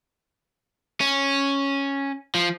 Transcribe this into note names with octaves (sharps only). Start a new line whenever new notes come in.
C#4
F3